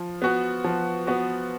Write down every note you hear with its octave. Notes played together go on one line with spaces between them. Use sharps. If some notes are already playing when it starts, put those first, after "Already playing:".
Already playing: F3
B3 F#4
F3
B3 F#4